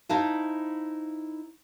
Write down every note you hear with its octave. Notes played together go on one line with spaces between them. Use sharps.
D#4 E4 C5 F5 A5